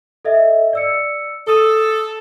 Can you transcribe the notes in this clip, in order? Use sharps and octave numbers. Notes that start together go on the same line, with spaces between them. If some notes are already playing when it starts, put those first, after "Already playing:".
A4 D#5 E5
D5 E6 C#7
A4 D#6 E6 D#7